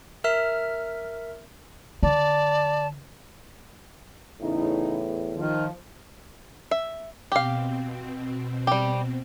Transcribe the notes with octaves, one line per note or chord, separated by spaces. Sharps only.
A#4 E5 F6
D3 D5 A5
E2 A2 C#3 D#4 E4
D#3 F3
E5
B2 C4 G4 F5
G3 G4